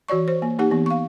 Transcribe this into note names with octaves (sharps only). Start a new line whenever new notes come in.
E3 F#4 C#5 D5 C#6
C5
A#3
A#3 D#4 G4 F#5
E3 B3
F5 C#6